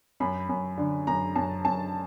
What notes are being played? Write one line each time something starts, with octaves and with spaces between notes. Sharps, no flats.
F#2 B5
F#2
D3
F#2 A#5
F#2 A5
F#2 A5